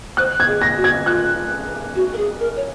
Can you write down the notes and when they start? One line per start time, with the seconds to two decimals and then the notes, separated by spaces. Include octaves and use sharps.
0.17 C5 F#6
0.40 G#6
0.47 G#4
0.62 A#6
0.77 F#4
0.84 G#6
1.06 F4 F#6
1.95 F#4
2.13 A#4
2.17 G#4
2.40 A#4
2.56 C#5